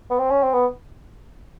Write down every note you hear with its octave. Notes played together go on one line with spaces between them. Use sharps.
B3
C4
C#4
C4
B3